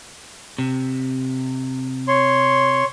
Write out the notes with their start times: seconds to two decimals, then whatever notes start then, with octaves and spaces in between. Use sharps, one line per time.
0.58 C3
2.08 C#5 C6